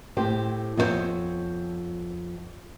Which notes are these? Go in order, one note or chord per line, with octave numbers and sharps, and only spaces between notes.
A2 C4 G4 C5
F2 B3 D#4 F#4 C5 C#5